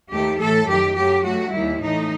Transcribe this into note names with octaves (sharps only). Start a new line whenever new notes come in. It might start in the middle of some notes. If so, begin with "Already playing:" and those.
D#2 D#3 A3 G4
A2 E3 A3 A4
F#2 D#3 A3 G4
F#2 F#3 A3 G4
G2 F#3 A3 F#4
D#2 D#3 G3 E4
A2 E3 A3 D#4